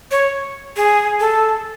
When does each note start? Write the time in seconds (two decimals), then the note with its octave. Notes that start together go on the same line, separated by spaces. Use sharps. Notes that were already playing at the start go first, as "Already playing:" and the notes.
0.11 C#5
0.76 G#4
1.20 A4